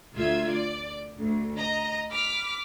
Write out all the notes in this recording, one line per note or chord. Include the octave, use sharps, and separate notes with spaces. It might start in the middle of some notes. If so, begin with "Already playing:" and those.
D2 F4 E5 G#6
D5
D2
D#5 A#5
B5 D6 F6 B6